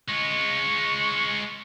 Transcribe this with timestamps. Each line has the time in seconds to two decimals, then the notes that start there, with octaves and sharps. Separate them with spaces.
0.09 G#3 F4 C#6